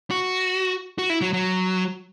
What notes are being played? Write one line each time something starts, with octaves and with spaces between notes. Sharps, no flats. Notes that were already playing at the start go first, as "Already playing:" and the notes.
F#4
F#4
E4
F#3
F#3